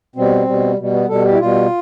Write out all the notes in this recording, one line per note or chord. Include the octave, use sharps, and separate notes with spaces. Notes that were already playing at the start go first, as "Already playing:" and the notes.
B2 G3 C4
B2 G3
B2 G3
B3
B2 G3 A4
G4
E4
B2 G3 F4